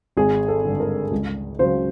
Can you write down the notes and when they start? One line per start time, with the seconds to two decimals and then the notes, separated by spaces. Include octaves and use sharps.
0.17 G#1 G#4
0.48 A4
0.65 G2 D3
0.80 A#4
1.11 C#2
1.59 C#3 F#3 C5